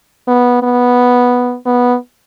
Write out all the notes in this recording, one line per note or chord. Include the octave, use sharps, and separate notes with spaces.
B3
B3
B3